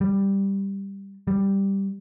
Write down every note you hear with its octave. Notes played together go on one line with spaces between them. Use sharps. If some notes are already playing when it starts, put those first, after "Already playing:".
G3
G3